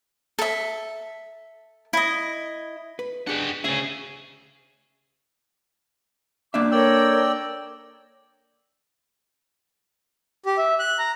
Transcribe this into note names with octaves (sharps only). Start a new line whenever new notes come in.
A4 E5
E4 D#5
B4
D4 G4 G#4 D#5 F#5
D2 C#3 C#4 G#4 E5
A#3 D4 E5 D6
A4 A#4 C#5 D5 G5 E6
G4
E5
F#6
A#5